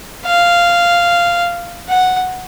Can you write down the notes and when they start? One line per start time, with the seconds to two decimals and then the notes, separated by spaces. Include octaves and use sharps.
0.26 F5
1.89 F#5